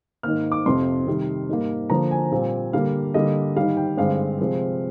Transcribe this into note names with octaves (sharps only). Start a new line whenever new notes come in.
G#2 D#3 A#3 F6
D6
F2 C3 F3 C6
C3 D#3 G3
G#2 G3 A#3
D3 F3 A#3 A#5
G#5
A#2 G3 C4
D3 G3 A#3 F5
D3 G3 A#3 D#5
G#2 D#3 G3 F5
G5
G2 D3 G#3 C4 F5
C3 F3 G#3 C4